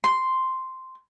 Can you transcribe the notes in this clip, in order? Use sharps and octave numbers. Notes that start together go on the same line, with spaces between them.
C6